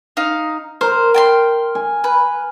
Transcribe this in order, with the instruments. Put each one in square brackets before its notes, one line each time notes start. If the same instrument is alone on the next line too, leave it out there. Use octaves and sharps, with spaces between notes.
[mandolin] D#4 F5
[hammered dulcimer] A#4 [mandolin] C5
[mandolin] G5 A5 C6
[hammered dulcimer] G#5
[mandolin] B4